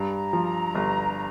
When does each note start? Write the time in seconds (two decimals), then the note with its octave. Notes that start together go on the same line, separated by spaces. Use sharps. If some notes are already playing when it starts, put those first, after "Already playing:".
Already playing: G2 A#5
0.33 F3
0.75 G1